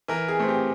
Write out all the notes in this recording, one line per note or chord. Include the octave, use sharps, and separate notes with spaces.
E3 A#4
G#4
A3 C4
G4